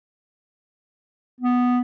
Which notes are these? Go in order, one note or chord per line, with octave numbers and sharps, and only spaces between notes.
B3